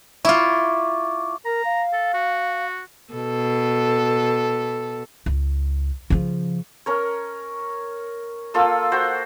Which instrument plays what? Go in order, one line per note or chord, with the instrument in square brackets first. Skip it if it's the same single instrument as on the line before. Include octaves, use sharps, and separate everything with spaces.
[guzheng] E4 F4 [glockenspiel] C#6 D6
[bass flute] A#4 [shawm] A#5
[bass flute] F5
[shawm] A4
F#4
[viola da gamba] B2 A4
[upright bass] C#2
C#3 F3
[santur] C#4 A#4 C#5
A#3 F4 A4 E6
F#4 C5 F#5 G5